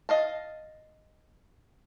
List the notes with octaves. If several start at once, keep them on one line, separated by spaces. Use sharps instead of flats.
D#5 F5 A5